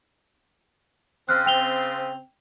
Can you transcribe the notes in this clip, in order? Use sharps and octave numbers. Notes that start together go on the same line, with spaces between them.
C#3 C4 F6 F#6
G5 F7 G7